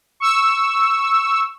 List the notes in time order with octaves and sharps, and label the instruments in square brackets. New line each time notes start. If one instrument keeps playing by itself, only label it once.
[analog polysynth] C#6 E6